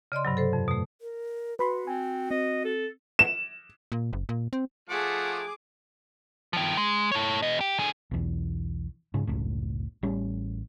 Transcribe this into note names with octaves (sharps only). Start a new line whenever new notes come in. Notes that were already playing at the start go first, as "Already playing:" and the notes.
C#3 D5 D#5 C6
G2 C3 F#3
A4 C5
F2
B2 A3
A#4
F#4 B4 B5 C6
C4 G#5
C4 D#5
A4
E7
A#2
F#1
A#2
C4
F3 A3 G#4 F#5 D6
D#3 F3
G#3
A4 C#5
E2 D#5
G4
D3 G#4
B1 E2
G#2 C#3
F#1 C#2 A2
A1 G3 C#4